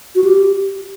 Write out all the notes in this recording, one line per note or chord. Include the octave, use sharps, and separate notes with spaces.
F#4
G4